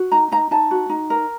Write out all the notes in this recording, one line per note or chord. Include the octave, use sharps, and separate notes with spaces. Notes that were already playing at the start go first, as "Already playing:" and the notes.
Already playing: F#4
D#4 A#5
D#4 A#5
D#4 A5
F#4
D#4
A#4